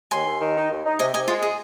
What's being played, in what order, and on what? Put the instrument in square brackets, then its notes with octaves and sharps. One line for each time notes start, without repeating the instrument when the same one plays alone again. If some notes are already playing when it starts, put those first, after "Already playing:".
[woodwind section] D#2 [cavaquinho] G#5 C6
[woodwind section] D#2
D#3
D#4
D#2
D#4
[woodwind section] C3 [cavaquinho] D#5 G#5
[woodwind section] C3 [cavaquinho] D#5 G#5
[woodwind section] G#3 [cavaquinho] F4
[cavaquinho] G#4